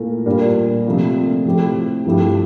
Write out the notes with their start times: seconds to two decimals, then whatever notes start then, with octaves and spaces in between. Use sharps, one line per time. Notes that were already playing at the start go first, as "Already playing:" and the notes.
Already playing: A#2 A3 E4 A#4
0.26 A#2 G3 D4 F4 A#4
0.86 C3 F3 A3 D4
1.45 A2 F3 C4 G4
2.05 G2 F3 A3 E4 G4